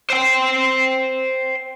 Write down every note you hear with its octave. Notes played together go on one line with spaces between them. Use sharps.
C5 G5